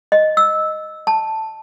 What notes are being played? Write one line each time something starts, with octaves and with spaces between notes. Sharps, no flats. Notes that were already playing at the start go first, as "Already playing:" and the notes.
D#5
E6
A5